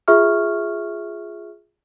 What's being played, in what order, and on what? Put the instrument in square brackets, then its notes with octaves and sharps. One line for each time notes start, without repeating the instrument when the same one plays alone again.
[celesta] F4 G#4 E5 C#6 F6